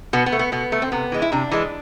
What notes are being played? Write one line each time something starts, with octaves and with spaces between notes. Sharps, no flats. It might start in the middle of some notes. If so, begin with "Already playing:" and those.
B2 B3
B3
A3
B3
B2 B3
A3
C4
C3 B3
E3 G#3
E4
C3 D4
E3 G#3